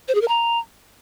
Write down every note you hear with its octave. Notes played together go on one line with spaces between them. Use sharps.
C5
G#4
A#4
A#5